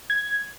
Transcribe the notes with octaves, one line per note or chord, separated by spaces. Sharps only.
G#6